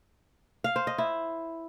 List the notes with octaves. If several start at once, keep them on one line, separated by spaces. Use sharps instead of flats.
F5
C5
D#5
E4